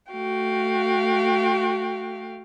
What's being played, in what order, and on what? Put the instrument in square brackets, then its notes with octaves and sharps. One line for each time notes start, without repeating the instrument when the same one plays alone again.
[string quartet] A3 F#4 F5 G5